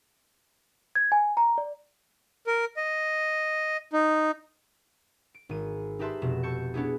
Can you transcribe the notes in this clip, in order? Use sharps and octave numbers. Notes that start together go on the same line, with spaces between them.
G#6
G#5
A#5
D5
A#4
D#5
D#4
D7
G#1 D#7
D#4 G4 B4 E5 A5 C6
F1 B2 E7
A4 A5 C#6 G6 C#7
B3 C#4 D4 E4 G#4